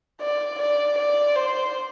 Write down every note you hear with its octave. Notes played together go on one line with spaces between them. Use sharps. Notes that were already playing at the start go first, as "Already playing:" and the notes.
D5
D5
D5
C5